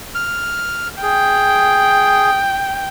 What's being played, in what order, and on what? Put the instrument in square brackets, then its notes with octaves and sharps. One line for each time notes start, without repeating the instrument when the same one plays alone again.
[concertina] F6
[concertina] G#4 [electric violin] G5